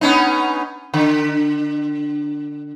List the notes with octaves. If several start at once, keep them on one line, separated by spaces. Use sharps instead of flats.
B3 C#4 D#4
D3